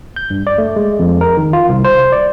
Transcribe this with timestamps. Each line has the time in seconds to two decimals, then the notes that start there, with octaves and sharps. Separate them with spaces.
0.16 G6
0.30 G2
0.47 D5
0.58 A3
0.76 G#3
0.99 F2
1.21 A#4
1.37 D#3
1.53 F4
1.69 C2
1.84 C5
2.12 D5